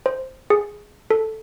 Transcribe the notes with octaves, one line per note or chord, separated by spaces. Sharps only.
C5
G#4
A4